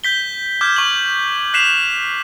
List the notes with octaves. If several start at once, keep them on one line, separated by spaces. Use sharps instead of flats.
G6 B6 G7
D6 F6 G6 G#6
C#6 F#7
F#6 B6 C7 E7 F7